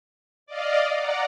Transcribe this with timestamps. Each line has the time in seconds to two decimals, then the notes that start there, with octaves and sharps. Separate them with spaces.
0.46 D5 D#5 F5
0.95 D5 F#5 A#5